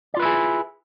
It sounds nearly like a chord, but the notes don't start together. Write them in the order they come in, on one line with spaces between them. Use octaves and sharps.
D5 F4 B4 E4 G#4